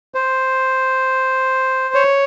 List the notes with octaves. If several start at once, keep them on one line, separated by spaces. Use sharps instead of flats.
C5
C#5